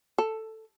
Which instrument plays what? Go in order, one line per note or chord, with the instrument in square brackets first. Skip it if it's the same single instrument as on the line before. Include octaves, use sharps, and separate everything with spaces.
[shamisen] A4